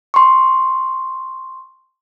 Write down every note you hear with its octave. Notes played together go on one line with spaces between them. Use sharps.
C6 C#6